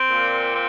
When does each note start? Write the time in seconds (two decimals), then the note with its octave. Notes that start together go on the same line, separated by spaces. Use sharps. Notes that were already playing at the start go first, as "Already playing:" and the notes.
Already playing: C4
0.10 A#2
0.52 C4